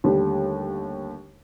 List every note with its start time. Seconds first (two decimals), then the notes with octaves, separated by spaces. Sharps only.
0.04 D#2 D3 G3 A3